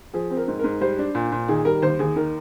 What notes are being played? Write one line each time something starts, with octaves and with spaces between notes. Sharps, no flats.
F3 G#4
C4
A#4
G#2
G#2 A#4
G3 C5
D4
A#2
A#2
D#3 G#4
G3 A#4
D#2 C5
D#2 G#4
D#3 A#4